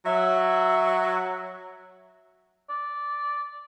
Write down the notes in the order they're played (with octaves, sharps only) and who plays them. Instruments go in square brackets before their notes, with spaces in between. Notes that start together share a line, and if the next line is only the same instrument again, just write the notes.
[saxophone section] F#3 E5
[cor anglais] D5